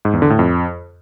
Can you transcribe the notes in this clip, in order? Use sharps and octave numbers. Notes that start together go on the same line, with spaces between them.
G#2
E2
D3
A2
F2